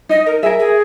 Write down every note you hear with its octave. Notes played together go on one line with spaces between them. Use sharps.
D#4 D#5
A#4
G#4 A#4 E5
G#4